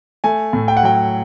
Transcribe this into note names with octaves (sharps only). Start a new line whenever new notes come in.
A3 G#5
A2
G5
F#5
F#3 G5